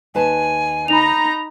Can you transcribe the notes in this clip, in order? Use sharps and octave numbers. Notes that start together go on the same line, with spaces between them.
D#2 B4 G#5 A5
D#4 A#5 B5 F7